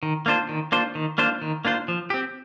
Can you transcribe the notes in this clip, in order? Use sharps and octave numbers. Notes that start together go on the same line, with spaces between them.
D#3
A#3 D4 F4 C5
D#3
A#3 D4 F4 C5
D#3
A#3 D4 F4 C5
D#3
A#3 D4 F4 C5
F3
C4 G4